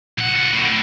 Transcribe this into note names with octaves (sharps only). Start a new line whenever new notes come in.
B1 F#5
F4 F#5
A2 D3